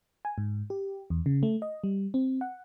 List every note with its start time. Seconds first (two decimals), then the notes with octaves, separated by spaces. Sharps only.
0.25 G#5
0.38 G#2
0.70 G4
1.10 E2
1.26 C#3
1.43 A3
1.62 D#5
1.84 G3
2.14 C4
2.41 F#5